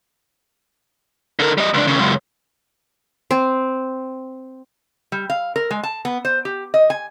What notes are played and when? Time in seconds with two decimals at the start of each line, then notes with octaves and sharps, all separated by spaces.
1.39 D3 A#4
1.58 G3 D#5
1.74 C#2 D4
1.87 D#2 C#3
1.99 C#2 F#2
3.31 C4
5.12 G3
5.30 F5
5.56 A#4
5.71 G#3
5.83 A5
6.05 B3
6.25 C5
6.45 G4
6.74 D#5
6.90 G#5